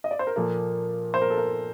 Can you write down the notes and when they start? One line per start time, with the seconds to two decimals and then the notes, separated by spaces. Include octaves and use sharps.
0.04 D#5
0.11 D5
0.19 C5
0.27 A#4
0.36 A#2 F3 A#3 A4
1.14 C5
1.22 A#4
1.30 A4
1.37 A#4